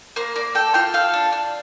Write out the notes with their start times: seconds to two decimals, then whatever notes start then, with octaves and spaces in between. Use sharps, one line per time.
0.16 A#3 C5
0.36 A#3 D5
0.55 A4 G5
0.74 F4 G5
0.94 A4 F5
1.14 D4
1.32 D4